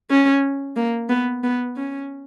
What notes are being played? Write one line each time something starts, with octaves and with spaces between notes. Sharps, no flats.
C#4
A#3
B3
B3
C#4